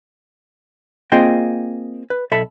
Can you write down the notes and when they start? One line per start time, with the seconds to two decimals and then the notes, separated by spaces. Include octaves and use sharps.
1.12 A#3 C4 F4 G#4 D#5 G5
2.10 B4
2.31 B1 A4 E5 A5 B5